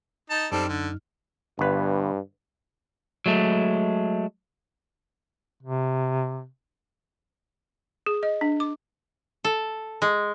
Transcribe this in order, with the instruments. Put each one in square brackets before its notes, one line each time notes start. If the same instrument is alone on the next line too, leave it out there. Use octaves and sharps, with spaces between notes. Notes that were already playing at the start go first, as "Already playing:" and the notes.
[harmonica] D#4 A5
[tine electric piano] F#2 D#4 F6 [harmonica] G3 C4 A4
[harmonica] D3
[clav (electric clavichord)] G1 B4 [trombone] G2
[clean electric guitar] F#3 G#3 A3
[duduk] C3
[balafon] G#4
D#5
D4
D6
[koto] A4
G#3